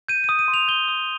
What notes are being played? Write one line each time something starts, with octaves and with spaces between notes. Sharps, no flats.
G6 D#7
D#6 D#7
D#7
C6
F7
G6 G7
D#6